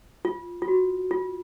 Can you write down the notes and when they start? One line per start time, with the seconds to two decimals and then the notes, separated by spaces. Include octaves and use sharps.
0.25 F4
0.62 F4
0.68 F#4
1.11 F4